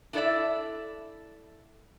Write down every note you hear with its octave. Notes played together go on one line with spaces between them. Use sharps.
D4 E4 A4 C#5 D5 E5